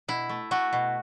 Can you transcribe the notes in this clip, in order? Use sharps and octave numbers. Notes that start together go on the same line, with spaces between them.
B2 E4
A3
A3 F#4
B2